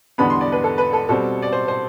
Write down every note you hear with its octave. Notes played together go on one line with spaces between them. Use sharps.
E2 D3 G3 B3 B5
C6
D5
B4
A4
B4
A4
B2 G3 C4 A4
D5
C5
C5